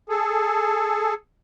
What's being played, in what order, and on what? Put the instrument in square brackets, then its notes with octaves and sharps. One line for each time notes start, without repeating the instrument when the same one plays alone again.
[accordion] G#4 A4